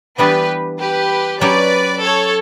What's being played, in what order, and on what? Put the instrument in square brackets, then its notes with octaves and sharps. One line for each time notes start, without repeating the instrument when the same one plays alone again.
[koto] E3 G3 B3 D4 [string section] G4 B4
[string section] G4 B4
[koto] F#3 C#4 G4 [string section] B4 D5
[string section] A4 C#5